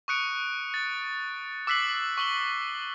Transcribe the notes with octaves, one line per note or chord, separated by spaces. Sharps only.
C#6 D#6 F#6 C#7 D7
A6
D6 E6 F#6 B6 C7 F#7
C#6 E6 F#7 G7